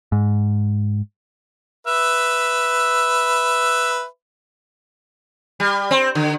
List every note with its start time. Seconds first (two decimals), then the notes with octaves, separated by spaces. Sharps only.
0.12 G#2
1.87 B4 E5
5.60 G3
5.91 C4
6.15 D3